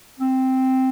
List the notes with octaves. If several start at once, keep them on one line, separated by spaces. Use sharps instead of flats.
C4